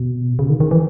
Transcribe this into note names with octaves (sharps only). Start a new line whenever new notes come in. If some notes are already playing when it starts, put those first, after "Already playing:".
Already playing: B2
C#3
D#3
D#3
E3